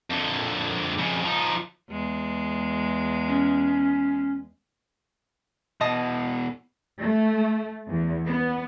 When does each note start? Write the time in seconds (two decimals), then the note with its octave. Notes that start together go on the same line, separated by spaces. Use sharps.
0.10 F2 D3
0.99 F2 C#3
1.24 F3 D#4
1.90 E2 G#3
3.27 C#4
5.81 B2 E3 D#5 A5 D#6
7.01 A3
7.88 E2
8.26 B3